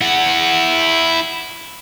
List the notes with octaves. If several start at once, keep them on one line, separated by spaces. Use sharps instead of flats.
E4 F#5